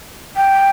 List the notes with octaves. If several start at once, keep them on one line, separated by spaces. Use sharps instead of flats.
G5